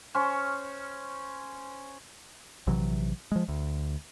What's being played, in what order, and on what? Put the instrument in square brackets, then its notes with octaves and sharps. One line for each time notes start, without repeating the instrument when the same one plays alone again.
[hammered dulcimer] C#4 C5 C#6
[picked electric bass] A#1 C3 E3 F#3
F3 G#3
D2